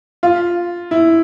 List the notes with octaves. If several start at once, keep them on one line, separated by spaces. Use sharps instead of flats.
F4
E4